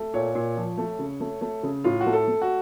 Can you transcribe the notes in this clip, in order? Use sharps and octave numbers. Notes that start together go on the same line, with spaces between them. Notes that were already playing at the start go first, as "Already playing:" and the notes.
Already playing: A3
A#2 C#5
A#2
F3
A3
C#3
A3
A3
C#3
A2 F4
F#4
A3
A4
A3
F#4